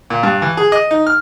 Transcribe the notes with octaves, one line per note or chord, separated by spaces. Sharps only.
A#2
G2
E3
G#4
D#5
D#4
F6